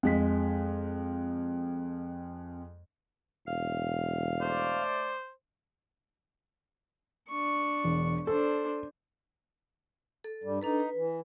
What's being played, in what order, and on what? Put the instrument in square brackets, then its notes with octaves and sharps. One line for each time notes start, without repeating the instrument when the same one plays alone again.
[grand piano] F2 G#3 B6
[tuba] E1 [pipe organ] F5
[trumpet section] A3 D5 [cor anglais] C5
[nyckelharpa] D4 C#6
[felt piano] E1
[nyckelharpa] D4 C5 [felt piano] A4
[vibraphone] A4
[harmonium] G2 G3
[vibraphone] D4 A4 B4 [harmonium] D#4
[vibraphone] B4
[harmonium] E3